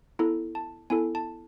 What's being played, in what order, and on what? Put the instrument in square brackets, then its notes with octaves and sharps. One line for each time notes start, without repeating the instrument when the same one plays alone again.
[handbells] B3 E4 A4 A#5
A5
B3 E4 A4 G#5
A5